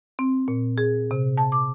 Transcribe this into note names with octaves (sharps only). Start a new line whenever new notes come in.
C4
A#2
G#4
C3
A5
D6